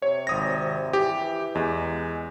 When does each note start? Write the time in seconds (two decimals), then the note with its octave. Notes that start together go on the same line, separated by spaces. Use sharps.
0.02 C3 C#5
0.27 G#1 D#6 A#6
0.93 E3 G4
1.55 E2 G#3